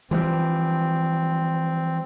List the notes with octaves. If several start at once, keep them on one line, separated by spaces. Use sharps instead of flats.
E3 F3 G3 C4